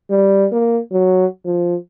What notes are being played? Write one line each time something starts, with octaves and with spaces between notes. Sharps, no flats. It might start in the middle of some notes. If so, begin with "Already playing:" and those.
G3
A#3
F#3
F3